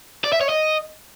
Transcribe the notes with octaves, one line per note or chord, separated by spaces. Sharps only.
D5
E5
C#5
D#5